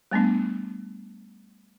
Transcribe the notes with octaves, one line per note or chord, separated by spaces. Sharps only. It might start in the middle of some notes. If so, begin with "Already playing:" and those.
G3 A3 B3 D4